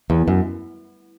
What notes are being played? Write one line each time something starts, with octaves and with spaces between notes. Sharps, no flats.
E2
F#2